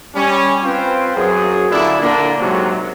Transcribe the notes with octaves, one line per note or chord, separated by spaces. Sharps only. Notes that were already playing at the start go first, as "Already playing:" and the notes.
G3 C#4
C4 F4 B4 C5
F#2 G#4
A#2 D3 D4 E4
A#2 D3 A#3 D4
G#2 C3 F#3